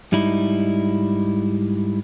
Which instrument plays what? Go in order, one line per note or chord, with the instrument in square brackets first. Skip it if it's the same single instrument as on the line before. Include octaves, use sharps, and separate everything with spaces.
[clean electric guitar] G#2 G3 D#4 E4